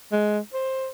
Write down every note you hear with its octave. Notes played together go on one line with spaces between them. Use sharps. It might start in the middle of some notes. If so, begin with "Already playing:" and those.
G#3
C5